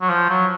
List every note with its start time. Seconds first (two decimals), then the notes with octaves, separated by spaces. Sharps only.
0.01 F#3
0.09 F3
0.29 F#3